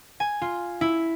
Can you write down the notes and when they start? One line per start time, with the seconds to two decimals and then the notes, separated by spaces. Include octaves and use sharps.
0.20 G#5
0.42 F4
0.81 E4